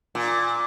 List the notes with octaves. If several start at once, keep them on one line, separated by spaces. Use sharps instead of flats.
A#2